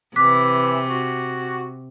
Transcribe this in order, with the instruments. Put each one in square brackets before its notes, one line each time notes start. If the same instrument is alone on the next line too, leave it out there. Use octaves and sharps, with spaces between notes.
[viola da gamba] C3 [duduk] E3 [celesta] D6 F#6 B6
[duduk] F#4